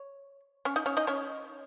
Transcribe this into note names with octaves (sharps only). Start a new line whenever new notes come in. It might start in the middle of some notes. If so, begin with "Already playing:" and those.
Already playing: C#5
C#4 C#5
D#4 D#5
C#4 C#5
D#4 D#5
C#4 C#5